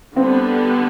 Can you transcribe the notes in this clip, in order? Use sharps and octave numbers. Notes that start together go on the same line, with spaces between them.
D3 G3 B3 C4